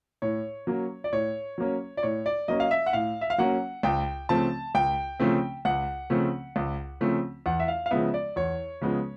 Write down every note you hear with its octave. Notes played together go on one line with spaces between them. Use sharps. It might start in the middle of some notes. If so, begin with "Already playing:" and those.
A2 C#5
F#3 A#3 C#4
D5
A2 C#5
F#3 A#3 C#4
D5
A2 C#5
D5
F#3 A#3 C#4 D#5
F5
E5
F#5
A2 F5
E5
F5
F#3 A#3 C#4 F#5
C#2 G5
C#3 F3 A3 C4 A5
C#2 G5
C#3 F3 A3 C4
C#2 F#5
C#3 F3 A3 C4
C#2
C#3 F3 A3 C4
E2 F#5
E5
F5
F5
C#3 F3 G#3 B3 E5
D5
E2 C#5
C#3 F3 G#3 B3